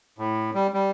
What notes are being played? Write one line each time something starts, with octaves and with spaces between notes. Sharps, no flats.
A2
G3
G3